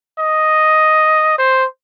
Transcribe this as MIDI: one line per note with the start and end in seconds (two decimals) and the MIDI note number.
0.20 1.37 75
1.39 1.65 72